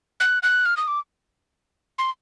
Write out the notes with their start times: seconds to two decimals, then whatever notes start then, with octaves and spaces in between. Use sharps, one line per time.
0.20 F#6
0.43 F#6
0.66 F6
0.77 D#6
0.88 D6
1.98 C6